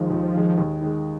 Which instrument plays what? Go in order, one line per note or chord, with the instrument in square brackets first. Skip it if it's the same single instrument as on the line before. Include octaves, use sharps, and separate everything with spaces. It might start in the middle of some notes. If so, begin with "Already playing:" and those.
Already playing: [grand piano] D#2 D#3 G#3 [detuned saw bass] F3
[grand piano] D#2
D#3 G#3
D#2
D#3 G#3